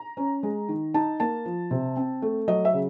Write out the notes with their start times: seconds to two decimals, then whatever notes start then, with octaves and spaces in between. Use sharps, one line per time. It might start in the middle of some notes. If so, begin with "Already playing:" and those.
Already playing: A#5
0.17 C#4
0.43 G#3
0.69 D#3
0.94 D#4 A5
1.20 A#3 A5
1.46 F3
1.71 C3
1.97 C4
2.22 A3
2.48 F#3 D#5
2.65 E5
2.73 C#3